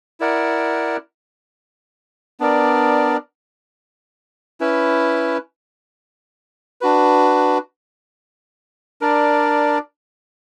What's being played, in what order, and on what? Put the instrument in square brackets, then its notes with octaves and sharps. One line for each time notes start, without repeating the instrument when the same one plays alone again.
[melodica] E4 A#4 D5 F#5
B3 D4 A#4 D5
C#4 E4 B4
D4 F#4 B4
D4 A#4 D5